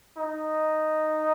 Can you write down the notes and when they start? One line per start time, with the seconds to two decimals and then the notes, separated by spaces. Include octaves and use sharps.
0.17 D#4